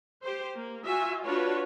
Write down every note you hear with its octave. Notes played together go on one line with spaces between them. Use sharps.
G4 C5
A#3
F4 F#4 E5 G#5
D4 F4 F#4 B4 C#5